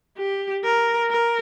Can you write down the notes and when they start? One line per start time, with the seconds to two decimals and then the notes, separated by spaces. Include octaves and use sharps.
0.18 G4
0.65 A#4
1.10 A#4